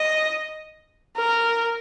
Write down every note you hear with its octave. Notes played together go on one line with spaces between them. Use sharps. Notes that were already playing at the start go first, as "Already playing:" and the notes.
Already playing: D#5
A#4